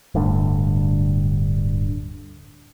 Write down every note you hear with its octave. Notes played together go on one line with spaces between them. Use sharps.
D1 D2 G2 D3